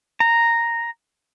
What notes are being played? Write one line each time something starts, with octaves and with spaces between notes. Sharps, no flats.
A#5